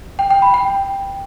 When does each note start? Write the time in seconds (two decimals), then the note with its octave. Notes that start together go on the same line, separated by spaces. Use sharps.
0.19 G5
0.31 G5
0.42 B5
0.54 G5